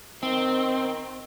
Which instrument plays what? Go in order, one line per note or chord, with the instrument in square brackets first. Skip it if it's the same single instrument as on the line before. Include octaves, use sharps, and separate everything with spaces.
[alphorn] D#3 [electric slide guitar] C4